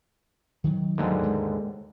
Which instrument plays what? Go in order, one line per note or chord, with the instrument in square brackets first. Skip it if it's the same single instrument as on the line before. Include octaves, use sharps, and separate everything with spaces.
[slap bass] D#3 F#3
[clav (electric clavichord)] D#2 G#2 D3 [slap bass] F#3 A3 A#3
[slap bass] G#3